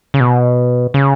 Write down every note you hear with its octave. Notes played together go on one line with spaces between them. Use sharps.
C#3
B2
C#3